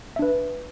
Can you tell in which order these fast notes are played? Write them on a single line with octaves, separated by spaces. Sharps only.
E5 D4 B4